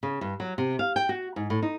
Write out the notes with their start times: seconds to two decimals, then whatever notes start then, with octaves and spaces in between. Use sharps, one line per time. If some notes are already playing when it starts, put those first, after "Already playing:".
0.03 C#3
0.21 G2
0.40 F#3
0.58 C3
0.79 F5
0.96 G5
1.09 F#4
1.36 G#2
1.50 A2
1.62 D#4